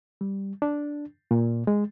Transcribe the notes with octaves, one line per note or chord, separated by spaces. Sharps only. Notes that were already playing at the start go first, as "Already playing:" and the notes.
G3
D4
A#2
G#3